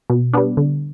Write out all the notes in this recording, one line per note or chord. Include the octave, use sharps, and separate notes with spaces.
B2
G3 B3 D4
D3